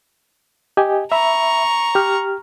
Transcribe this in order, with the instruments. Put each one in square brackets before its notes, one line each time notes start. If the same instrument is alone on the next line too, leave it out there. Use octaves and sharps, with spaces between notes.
[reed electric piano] G4 D#5 G#5
[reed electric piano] E5 B5 [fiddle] A#5 C#6
[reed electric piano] G4 F6